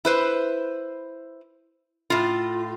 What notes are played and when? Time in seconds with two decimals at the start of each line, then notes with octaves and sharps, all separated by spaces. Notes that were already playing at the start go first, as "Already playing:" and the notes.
0.05 E4 B4 C5
2.10 A2 F4